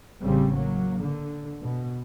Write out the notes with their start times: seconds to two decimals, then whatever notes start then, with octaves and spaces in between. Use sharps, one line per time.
0.21 A1 C#3 G3 C4
0.55 F#3 A#3
1.01 D3
1.61 B2